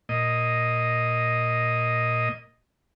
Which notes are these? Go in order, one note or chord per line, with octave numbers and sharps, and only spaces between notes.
A#2 D#5